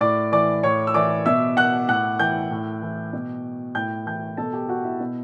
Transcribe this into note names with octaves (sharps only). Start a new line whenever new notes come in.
A2 D5 D6
E3 D5 D6
A2 C#5 C#6
E6
E3 D5 D6
B2 E5 E6
F#5 F#6
A2 F#5 F#6
E3 G5 G6
A2
E3
B2
A2 G5 G6
E3 G5 G6
B2 A4 A5
G4 G5
F#4 F#5
E4 E5
B2